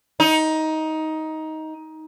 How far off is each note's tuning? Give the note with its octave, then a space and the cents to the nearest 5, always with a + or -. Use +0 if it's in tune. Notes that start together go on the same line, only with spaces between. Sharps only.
D#4 +15